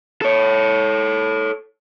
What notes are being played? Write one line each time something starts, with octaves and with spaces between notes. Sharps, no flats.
A4 C#5